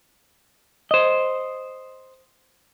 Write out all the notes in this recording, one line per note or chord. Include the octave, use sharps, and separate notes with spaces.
C5 D#5